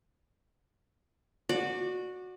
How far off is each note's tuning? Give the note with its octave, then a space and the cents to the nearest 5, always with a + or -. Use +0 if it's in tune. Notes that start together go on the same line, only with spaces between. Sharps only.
F#4 -15 D5 +15